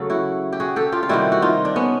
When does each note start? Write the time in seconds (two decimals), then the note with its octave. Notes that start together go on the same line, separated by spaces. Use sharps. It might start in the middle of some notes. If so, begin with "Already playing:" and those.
Already playing: C#3 F#3 A3 A4
0.10 E4 F#4
0.53 G4
0.60 F#4 G#4
0.76 G4 A4
0.92 F4 G4
1.03 F4
1.09 C3 D#3 G3 E4 F#4
1.32 F#4
1.42 D#4 F4
1.65 D4
1.76 B3 C#4